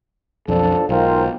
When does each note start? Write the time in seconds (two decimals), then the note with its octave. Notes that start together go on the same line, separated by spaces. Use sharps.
0.48 B1 F2 F3 D4 A4
0.89 B1 G#2 F4 A#4 C5 G5